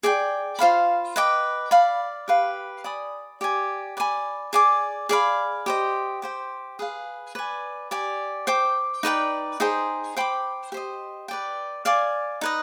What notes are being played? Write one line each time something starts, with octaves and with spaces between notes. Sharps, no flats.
G#4 D5 G5
F4 C5 F5 B5
B4 D#5 G5 D6
D5 F5 B5
G4 B4 F5
D5 G#5 B5 D#6
G4 D5 G#5
B4 D5 G#5 B5
G#4 D5 G#5 D6
G#4 D5 F5 B5
G4 C5 D#5
G4 C5 G5
G#4 B4 F5
B4 D5 G#5
G4 D5 G#5
C5 G5 D6
D#4 B4 D5 G5
D#4 G#4 C5 G5
C5 G5 B5 D6
G4 C5 D#5
B4 D5 G5
D5 F5 G#5 D6
D#4 B4 D#5